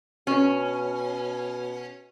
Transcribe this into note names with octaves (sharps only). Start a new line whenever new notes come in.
B2 C#4